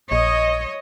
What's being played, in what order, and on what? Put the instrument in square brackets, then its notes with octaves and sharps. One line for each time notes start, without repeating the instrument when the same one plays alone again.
[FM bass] A#1 [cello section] C#5 [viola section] D#5